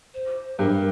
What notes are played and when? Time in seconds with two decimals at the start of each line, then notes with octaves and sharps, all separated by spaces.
0.14 C5
0.59 G2 A#4